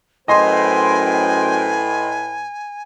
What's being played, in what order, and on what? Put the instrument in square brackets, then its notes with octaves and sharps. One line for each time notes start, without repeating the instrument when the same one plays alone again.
[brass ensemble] F#2 C5 G5 [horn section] A2 B4 [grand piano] D#5 C6 [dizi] G#5